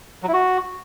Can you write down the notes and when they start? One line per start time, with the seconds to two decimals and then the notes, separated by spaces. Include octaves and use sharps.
0.23 F#3
0.28 E4
0.33 F#4